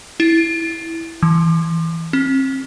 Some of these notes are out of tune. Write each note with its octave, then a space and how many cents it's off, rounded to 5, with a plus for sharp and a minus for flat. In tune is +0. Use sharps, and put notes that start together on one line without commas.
E4 -5
E3 -5
C4 +40